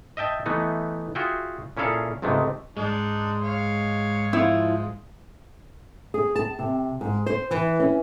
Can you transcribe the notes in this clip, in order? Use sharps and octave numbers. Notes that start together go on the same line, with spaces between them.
D#5 E5 G5 A5
E3 A3 B3 D#4
F4 F#4 G#4 E5 G5
A#2 C#4 E4 G#4 A4 F5
C#2 G#2 C3 G#3 A3
G#2 G#3 D4 D#4
C#5 F5
F3 E4 F4
G#4
A5
C3
G#2
C5
E3
C#4